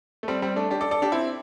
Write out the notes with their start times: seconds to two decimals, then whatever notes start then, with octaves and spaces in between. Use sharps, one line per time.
0.23 A3
0.28 G3 C4
0.42 G3 C4
0.56 A3 D4
0.70 D4 G4
0.81 A4 D5
0.91 A4 D5
1.02 D4 G4
1.12 C4 E4